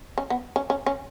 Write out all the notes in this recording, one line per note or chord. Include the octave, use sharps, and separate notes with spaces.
C#4
B3
C#4
C#4
C#4